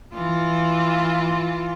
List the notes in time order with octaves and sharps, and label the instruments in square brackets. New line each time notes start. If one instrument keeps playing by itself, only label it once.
[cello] E3 F4